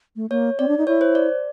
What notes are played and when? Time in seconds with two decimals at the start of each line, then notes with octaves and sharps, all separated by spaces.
0.16 A3
0.30 A#3 C#5
0.59 C4 D5
0.68 D4
0.78 D#4
0.87 E4 C#5
1.01 C5
1.15 D5